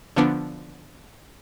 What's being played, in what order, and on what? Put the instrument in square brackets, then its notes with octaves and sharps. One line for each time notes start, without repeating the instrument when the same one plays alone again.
[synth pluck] D3 F3 B3 D4